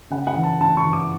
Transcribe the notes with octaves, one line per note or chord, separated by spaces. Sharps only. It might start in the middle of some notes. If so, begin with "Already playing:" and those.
C#3 F#5
F#5
E3
A5
C#3 A5
C#6
E3
D6